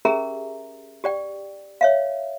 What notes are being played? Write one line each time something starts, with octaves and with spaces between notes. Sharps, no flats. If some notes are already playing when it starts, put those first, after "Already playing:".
C#4 G4 G#4 A#4 E5 A#5
G4 D5 G5
C#5 E5 F5